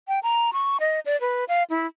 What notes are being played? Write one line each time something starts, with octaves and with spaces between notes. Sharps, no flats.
G5
A#5
C#6
D#5
D5
B4
F5
E4